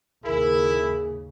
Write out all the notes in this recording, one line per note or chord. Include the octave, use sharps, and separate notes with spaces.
D#2 G#2 C#3 E4 G#4 A#4